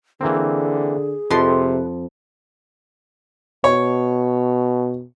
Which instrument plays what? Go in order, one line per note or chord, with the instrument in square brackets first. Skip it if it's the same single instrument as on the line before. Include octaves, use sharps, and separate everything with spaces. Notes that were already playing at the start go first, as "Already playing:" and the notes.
[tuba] D3 [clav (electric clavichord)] E3 A#3 C4 [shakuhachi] G#4
[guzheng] F2 F3 C6 [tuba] C3 [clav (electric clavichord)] B4
[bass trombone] B2 [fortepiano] C#5